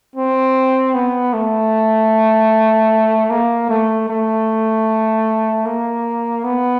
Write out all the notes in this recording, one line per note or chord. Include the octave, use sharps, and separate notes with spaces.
C4
B3
A3
A#3
A3
A3
A#3
B3